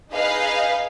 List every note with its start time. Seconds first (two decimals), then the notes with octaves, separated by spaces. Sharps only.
0.12 D#4 G#4 B4 D#5 F5